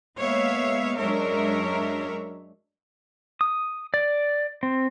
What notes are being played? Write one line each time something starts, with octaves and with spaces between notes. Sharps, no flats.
G#3 A#3 B3 C#5 E5 F5
F#2 G#3 D4 A#4 C#5 E5
D#6
D5
C4